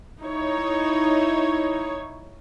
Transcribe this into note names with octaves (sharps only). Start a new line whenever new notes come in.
D#4 E4 C#5